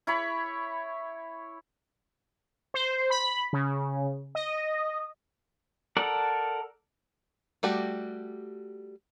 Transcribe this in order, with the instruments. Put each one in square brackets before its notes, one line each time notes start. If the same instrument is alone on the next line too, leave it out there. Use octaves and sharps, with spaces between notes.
[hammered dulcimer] E4 C#5 B5
[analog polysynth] C5
B5
C#3
D#5
[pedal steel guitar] A4 A#4 D5 F#5
[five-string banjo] G3 A3 F#4 G4